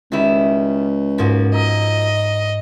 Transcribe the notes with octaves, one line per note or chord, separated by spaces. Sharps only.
C#2 D#3 G3 E4
G#2 F3 A#3 F#4 A#4
D#5 A#5 E6 B6